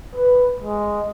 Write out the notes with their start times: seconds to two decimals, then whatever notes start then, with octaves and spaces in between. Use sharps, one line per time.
0.16 B4
0.61 G#3